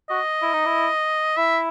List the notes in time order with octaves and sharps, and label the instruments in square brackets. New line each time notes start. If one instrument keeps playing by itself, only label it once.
[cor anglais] F#4 [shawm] D#5
[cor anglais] E4
D#4
E4
[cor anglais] E4 [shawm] E5